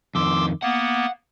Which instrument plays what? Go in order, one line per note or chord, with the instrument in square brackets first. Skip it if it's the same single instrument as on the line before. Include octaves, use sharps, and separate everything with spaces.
[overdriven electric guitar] F2 D#3 [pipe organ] C6 D6 E6
[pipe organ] A#3 B3 [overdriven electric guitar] F#5